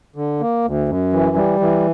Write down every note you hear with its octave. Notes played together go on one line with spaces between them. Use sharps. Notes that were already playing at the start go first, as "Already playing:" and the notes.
D3
A#3
D2
F#2
E3
G3
E3